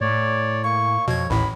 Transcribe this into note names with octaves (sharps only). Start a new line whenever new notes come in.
A2 C#5 D5
A#3 C#6
F2 B2 C#5 G#6
A1 D#2 A2 B5